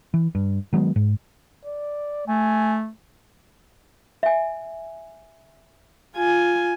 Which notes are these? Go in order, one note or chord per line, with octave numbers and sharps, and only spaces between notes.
E3
G2
D#3 F#3 G#3 B3
G#2
D5
A3 G#5
E5 G#5
F4 G#5